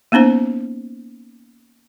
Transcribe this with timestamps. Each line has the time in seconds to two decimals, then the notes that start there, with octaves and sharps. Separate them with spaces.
0.12 A#3 B3 C#4 D#4 C5